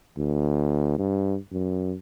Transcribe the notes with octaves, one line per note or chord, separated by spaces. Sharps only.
D2
G2
F#2